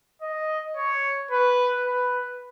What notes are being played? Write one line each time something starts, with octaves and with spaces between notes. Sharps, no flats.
D#5
C#5
B4
B4